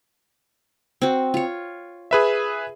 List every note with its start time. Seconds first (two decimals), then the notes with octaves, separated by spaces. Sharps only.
1.02 C4 F#4
1.34 F4 C#5
2.11 G#4 B4 E5